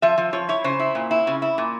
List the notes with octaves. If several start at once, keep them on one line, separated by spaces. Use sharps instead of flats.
F3 E5
F3
F3 C#5
E4 C#5
C#3 C5
E4
A#2
E4
C#3
E4
A#2